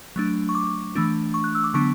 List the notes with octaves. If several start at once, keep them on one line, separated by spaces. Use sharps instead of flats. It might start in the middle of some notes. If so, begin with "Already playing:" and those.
F#3 A3 D4
C#6
D6
E3 A3 D4
C#6
F#6
E6
D6
D3 F#3 B3 D4 C#6